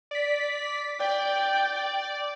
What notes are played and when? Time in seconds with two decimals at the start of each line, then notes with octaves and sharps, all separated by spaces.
0.11 D5 B6
1.00 D5 G5